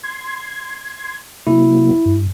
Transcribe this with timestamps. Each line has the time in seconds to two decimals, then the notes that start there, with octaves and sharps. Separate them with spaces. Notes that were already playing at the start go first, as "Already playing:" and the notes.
0.03 C6 G#6
1.47 C3 F#3 A#3 E4
2.05 G2